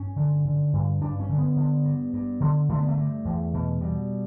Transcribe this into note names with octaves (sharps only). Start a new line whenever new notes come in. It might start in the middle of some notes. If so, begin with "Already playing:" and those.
Already playing: G2 C#4
D3
D3
G2
G2 D4
C#4
D3
B3
D3
G2
G2
D3
D3 A3
B3
A3
G2
E2
B2
B2 G3